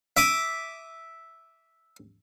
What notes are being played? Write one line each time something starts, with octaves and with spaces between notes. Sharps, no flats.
E5 D6 D#6